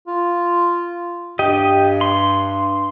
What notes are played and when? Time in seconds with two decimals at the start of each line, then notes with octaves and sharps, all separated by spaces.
0.07 F4
1.39 G2 G4 D#5
2.01 C6